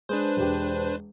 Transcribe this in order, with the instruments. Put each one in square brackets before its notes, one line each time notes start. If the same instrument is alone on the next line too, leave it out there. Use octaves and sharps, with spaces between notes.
[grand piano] G#3 [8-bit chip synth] D4 B4 C5
[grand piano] E1 G4 G5